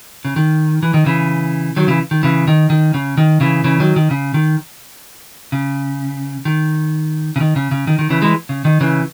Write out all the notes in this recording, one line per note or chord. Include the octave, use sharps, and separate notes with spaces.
C#3
D#3
E3
D#3
C#3 E3
D#3 F#3
C#3 E3
D#3
C#3 E3
D#3
D#3
C#3
D#3
C#3 E3
C#3 E3
D#3 F#3
D#3
C#3
D#3
C#3
D#3
C#3
D#3
C#3
C#3
D#3
D#3
C#3 E3
E3 G#3
C#3
D#3
C#3 E3